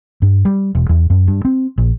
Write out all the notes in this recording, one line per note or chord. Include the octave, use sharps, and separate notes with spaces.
G2
G3
E1
E2
F#2
G2
C4
A#1